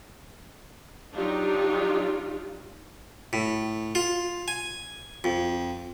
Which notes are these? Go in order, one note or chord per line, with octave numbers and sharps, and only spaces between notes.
F#3 D4 D#4 F4 G4
A2
F4
G#5
F2